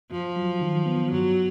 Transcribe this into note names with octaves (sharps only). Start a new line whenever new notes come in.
F#2 F3
F#3
D#3
B3
G2 F#3